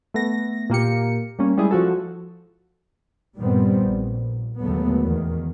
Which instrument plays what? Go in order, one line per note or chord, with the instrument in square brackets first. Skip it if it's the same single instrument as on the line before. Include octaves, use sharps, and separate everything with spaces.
[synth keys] A3 B3 A#6
A#2 A#3 G4 C#7
G3 A#3 C#4
G3 G#3 E4 G#4
F3 F#4 A4
[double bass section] G2 A#2 D#3 G3 B3 C4
A#1
D#2 D3 F#3 G#3 A3 B3
E2 D#3